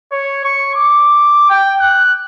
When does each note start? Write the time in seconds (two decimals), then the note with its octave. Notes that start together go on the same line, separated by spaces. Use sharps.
0.12 C#5
0.44 C#6
0.75 D6
1.50 G5
1.81 F#6